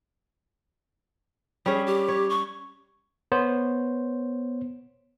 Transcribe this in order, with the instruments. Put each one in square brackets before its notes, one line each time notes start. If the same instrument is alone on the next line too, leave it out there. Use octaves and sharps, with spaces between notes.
[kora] G3 C#4 [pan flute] G#4
[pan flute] G4
[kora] C#5
[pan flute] C#6
[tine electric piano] B3 C5 C#5